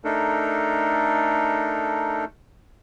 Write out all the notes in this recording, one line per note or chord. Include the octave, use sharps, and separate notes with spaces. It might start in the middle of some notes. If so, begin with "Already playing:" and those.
A3 D4 D#4 A4 A#4